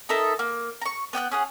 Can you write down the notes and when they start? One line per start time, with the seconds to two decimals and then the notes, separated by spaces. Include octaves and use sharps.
0.09 D#4 A4 A#4 E5
0.39 A#3
0.81 A#5 C#6
1.13 B3 G5 D6 F#6
1.31 C#4 G#4 F#5